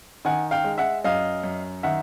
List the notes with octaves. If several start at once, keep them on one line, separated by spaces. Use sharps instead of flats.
D#3 F#5 G#5
F5 G5
G#3
E5 F#5
F#2 D#5 F5
F#2
D#3 E5 F#5